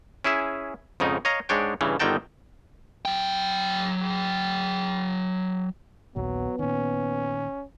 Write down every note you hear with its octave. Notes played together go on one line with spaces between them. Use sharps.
C#4 E4 G#4 E5
F2 G#2 C#3 D#4
C#5 D#5 F5 A#5
G#2 G#3 D4 C#5 G5
G2 C#3 E3
G1 D3 D#3 D#4 G5 A5
F#3 G5
A#1 D#2 A#2 F#3 B3
A#2 D#3 C#4